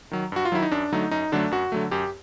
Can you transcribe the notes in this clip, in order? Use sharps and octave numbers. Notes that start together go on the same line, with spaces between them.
D#3 F#3
G2 F#4
F4
D#3 F#3 E4
D#4
F#2 D4
D3 F#3 A3 D#4
F#2 D#4
D3 F#3 A3 D4
F#2 F#4
D3 F#3 A3
F#2 G4